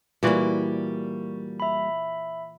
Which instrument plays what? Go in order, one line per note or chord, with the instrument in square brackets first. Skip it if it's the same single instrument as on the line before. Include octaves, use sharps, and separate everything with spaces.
[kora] A#2 E3 F#4 [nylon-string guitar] G3 A#3 [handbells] C#6
[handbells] E5 B5